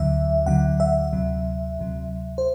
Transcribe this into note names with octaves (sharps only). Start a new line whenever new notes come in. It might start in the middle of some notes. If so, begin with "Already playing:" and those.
Already playing: D2 D3 F#3 E5
D2 D3 F#3 F#5
E5
D2 C3 F#3
D2 C3 F#3
C5